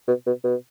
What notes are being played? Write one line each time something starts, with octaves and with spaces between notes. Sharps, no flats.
B2
B2
B2